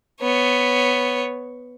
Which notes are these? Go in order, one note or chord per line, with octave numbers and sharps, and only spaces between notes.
B3 C#5